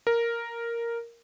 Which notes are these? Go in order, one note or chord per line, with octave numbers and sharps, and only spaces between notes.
A#4